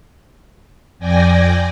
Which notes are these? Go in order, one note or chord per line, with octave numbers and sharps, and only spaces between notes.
F2 D5 G5 G#5 A#6